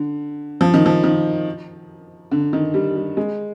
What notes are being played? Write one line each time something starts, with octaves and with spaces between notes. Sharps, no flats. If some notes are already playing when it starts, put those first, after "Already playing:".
Already playing: D3
F3
D#3
F3
D#3
D3
D#3
G3
G3
G#3